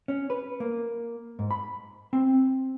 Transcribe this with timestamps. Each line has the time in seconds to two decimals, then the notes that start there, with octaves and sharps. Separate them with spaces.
0.08 C#4
0.30 B4
0.60 A#3
1.39 G#2
1.51 B5
2.13 C4